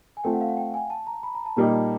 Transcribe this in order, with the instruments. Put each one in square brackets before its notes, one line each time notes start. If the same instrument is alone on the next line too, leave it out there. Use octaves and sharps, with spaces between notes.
[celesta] G#5
[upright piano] A3 C4 F4 [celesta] G5
[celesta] F#5
F5
F#5
G5
G#5
A5
A#5
B5
A#5
A5
[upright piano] A#2 G3 A#3 D#4 [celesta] A#5
[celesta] A5